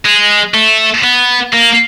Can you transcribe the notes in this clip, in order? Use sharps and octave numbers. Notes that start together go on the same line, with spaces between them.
G#3
A3
B3
A#3